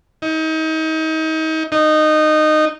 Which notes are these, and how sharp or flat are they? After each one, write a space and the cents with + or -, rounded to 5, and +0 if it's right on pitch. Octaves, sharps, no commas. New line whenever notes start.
D#4 +35
D#4 -15